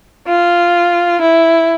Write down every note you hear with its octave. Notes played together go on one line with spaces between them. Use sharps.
F4
E4